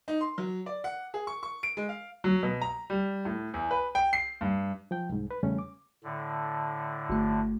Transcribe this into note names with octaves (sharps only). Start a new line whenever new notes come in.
D#4
C6
F#3
D5
F#5
G#4
C#6
C#6
D7
G#3
F5
F#3
B2
A#5
G3
A2
E2
B4
G5
C7
G2
F3 G5
C2 G#2
B4
E2 C#3 G3 A3 C#4
D6
A2 D3
G1 A3